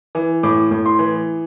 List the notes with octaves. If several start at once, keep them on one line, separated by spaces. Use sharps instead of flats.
E3
A2 D6
A2
C6
E3